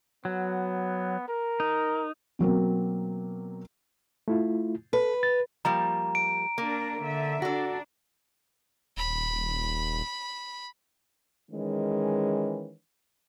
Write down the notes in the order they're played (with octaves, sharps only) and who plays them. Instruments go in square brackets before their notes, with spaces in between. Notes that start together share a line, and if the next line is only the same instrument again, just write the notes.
[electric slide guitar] F#3 [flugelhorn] B3
[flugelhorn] A#4
[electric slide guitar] D#4
[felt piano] B2 F#3 A#3 C4
[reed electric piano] A3 E4 F4
[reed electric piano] A4 [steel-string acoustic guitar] B4
[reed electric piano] A6
[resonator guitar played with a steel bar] F3 G3 A#3 [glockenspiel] A#5
[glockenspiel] D7
[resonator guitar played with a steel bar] A#3 [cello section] D4 A#4
[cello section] D3 E5
[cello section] D4 [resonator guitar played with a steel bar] F#4 A4
[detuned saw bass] D#1 [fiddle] B5
[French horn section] D#3 E3 G#3 C#4